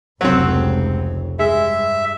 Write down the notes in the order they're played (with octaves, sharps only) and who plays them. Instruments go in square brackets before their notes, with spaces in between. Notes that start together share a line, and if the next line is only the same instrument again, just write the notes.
[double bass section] F1 C#2 [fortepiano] F#3 C4
[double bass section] G2 [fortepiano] G#3 [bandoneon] E5